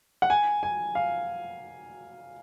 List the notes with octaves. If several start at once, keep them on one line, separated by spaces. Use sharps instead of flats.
F#5
G#5
G#5
F5